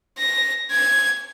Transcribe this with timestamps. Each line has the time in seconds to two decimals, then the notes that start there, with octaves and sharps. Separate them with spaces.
0.19 A#6
0.72 G#6